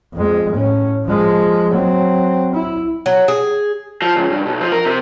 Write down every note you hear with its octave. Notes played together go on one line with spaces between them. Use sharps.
F2 G#3
A2 C#4
F3 G#3
F#3 C4
E4
F#3
G#4
F3
C#2
G2
B1
F3
A#4
C3